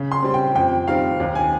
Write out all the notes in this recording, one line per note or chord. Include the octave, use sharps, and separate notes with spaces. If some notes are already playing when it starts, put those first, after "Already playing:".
Already playing: C#3
C6
G3 C4
G5
F2 G5
D#3 G3 C4 F5
D#2
G#5